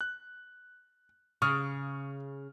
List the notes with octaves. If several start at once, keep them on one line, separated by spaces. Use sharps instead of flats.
F#6
C#3 C#6 D#6 F6